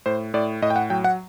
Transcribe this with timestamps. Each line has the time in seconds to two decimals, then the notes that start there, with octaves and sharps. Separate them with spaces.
0.06 A2 C5
0.34 A2 D5
0.62 A2 D#5
0.70 G5
0.76 F#5
0.90 F#3 G5
1.04 F#5